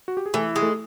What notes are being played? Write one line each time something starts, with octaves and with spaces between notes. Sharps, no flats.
F#4
G4
G#4
E3 A3 A4
G#3
A3 A4